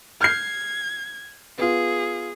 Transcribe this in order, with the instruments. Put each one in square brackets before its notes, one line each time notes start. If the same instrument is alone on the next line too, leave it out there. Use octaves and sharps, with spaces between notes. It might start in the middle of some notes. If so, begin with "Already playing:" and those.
[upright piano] F6 G6 C7 [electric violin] G#6
[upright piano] B3 F4 [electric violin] G#4